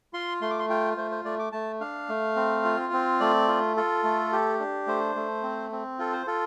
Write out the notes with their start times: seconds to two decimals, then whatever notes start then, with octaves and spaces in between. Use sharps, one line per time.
0.13 F4 C6
0.41 A3 C6
0.51 D6
0.59 C6
0.69 F4 G5
0.97 A3 C5
1.11 C5
1.25 A3 D5
1.39 D6
1.52 A3 A5
1.81 D4 F5
2.09 A3
2.36 C4
2.65 F4
2.93 C4
3.20 A3 D5
3.48 F4
3.77 F4 A4
4.04 A3
4.32 G4
4.60 D4
4.87 A3 C5
5.16 A3
5.43 C4
5.72 C4
5.99 F4 A4
6.13 C5
6.27 F4 A4